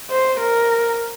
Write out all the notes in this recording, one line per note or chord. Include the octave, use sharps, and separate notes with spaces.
C5
A#4